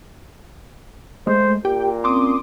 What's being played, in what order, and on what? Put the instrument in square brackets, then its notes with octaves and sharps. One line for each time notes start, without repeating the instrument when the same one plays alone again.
[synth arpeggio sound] G#3 A3 [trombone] C5
[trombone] A#2 [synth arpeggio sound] G4 G5
[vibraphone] C4 C#4 [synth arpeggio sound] C6 D6 D#6